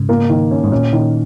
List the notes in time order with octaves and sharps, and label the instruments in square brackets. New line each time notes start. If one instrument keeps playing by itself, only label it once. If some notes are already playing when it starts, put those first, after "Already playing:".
Already playing: [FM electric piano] G#2 C#3
[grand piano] A#3
D#3
C#4
[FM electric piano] G#2
[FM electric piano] A#2 [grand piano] C#4
[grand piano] D#3